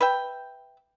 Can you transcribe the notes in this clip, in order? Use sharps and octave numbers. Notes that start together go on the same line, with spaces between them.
B4 E5 G5